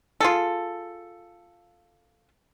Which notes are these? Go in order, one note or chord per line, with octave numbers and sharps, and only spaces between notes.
F4 G#4 A4